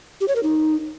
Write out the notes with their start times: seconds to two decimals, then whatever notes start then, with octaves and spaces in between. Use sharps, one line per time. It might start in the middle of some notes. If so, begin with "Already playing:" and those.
0.21 G4
0.28 C#5
0.36 A#4
0.43 D#4